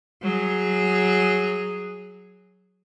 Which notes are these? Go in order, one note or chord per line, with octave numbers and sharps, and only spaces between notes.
F#3 G#4